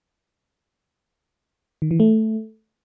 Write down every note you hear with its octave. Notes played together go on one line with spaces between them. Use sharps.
D#3
E3
A3